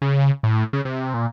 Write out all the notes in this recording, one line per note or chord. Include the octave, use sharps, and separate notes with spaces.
C#3
A2
C#3
C3
A#2